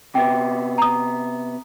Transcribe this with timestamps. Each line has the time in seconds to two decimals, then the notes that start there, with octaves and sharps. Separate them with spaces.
0.15 C3 B3 G5
0.78 A#5 D#6